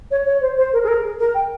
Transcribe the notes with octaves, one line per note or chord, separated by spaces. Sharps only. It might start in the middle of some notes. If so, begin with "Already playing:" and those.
C#5
C#5
C5
C5
A#4
G#4
A#4
G#4
A#4
G5